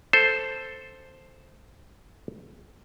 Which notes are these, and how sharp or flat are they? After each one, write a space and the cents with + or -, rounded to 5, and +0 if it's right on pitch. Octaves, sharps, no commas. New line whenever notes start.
A4 +0 C5 +0